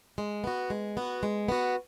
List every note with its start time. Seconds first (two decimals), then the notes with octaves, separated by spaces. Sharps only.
0.18 G#3
0.44 B3 F#4
0.70 G#3
0.97 B3 F#4
1.23 G#3
1.48 B3 F#4